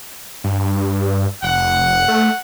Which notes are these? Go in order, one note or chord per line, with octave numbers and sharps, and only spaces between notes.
G2
F1 F#5
A3